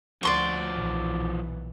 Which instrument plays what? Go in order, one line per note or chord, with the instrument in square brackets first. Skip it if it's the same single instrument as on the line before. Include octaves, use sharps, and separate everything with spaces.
[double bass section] D2 [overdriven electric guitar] F3 F#4 [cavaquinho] D5 C6 C#6
[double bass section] B1 A#2 E3